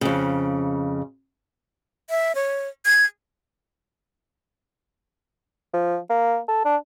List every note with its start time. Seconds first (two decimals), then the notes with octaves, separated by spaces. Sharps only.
0.01 F2 C#3
2.10 E5
2.35 C#5
2.86 G#6
5.74 F3
6.10 A#3
6.48 A4
6.65 D4